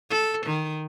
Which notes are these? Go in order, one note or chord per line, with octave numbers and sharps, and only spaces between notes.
A4
D#3